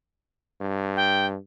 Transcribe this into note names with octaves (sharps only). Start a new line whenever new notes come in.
G2
G5